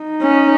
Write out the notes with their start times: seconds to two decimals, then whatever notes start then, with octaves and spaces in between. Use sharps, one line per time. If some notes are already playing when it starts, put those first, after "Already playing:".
Already playing: D#4
0.22 C#4